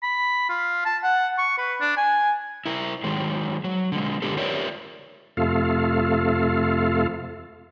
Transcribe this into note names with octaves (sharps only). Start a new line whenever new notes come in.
B5
F4
A5
F#5
C#6
B4
D4
G#5
E4 A#4
D#3 F#3 G#3
F#3
D3 G#3
D3 G#3 D4 G4 A4
F4 G4 A#4 C#5 D5 E5
F2 C3 A3 F4 A4 F5